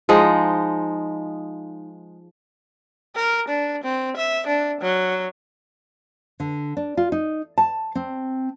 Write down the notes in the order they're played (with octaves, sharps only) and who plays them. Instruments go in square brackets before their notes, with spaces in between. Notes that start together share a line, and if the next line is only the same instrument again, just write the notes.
[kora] F3 G#3 D#4
[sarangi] A#4
D4
C4
E5
D4
F#3
[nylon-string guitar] D3
D4
F4
D#4
A5
C4